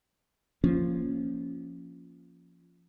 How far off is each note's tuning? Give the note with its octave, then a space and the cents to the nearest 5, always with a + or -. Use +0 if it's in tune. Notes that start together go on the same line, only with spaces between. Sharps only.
F3 -15 A#3 +0 C#4 +0